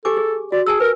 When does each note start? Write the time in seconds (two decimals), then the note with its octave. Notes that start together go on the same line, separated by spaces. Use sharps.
0.05 G4 A4 G#5 D6
0.17 G#4
0.52 F#4 D5
0.66 G#4 G#5 A5 E6
0.80 A#4 B4